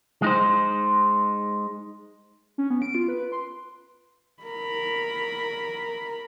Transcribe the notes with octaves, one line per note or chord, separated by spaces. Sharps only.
G#3 D#4 C5
C#4
B3
D7
F4
B4
C6
A#4 B5